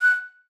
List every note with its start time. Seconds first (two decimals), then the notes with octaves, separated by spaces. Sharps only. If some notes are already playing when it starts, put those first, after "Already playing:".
0.02 F#6